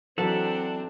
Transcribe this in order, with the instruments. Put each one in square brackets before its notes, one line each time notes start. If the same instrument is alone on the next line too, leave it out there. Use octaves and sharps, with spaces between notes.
[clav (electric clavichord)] E3 F#3 [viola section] C4 D4 [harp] A4 [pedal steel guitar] E5 F#5